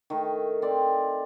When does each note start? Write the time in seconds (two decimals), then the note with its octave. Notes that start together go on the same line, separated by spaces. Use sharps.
0.10 D#3 A3
0.62 C4 D5